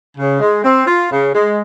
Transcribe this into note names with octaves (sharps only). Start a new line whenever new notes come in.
C#3
G#3
C4
F4
C#3
G#3